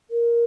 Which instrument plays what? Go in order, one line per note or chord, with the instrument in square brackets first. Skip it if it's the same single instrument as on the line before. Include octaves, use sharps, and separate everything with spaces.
[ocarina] A#4